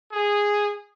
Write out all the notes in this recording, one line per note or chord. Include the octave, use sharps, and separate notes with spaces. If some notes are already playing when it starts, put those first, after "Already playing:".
G#4